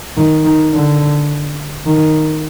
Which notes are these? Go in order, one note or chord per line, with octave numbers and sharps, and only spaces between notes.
D#3
D#3
D3
D#3